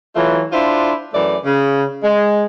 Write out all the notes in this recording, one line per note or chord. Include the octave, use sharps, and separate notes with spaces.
E3 F#3 A3 F4
D4 E4 F4 C5
F#2 E3 A3 D5
C#3
G#3